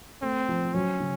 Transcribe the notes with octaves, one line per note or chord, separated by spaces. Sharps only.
A3 C4
F3
F#3 C#4
C#3